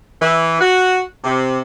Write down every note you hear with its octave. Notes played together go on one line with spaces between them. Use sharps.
E3
F#4
C3